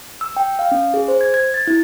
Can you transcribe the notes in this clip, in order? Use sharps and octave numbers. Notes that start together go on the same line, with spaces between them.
E6
G5
F5
C#4
G#4
C5
G#6
G#6
A6
E4